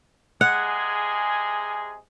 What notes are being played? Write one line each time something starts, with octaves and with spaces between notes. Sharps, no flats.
C3 G#3 G#4 F#5